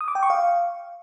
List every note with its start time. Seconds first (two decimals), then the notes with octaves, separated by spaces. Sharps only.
0.01 D#6
0.08 D6
0.15 G5
0.23 C#6
0.30 F5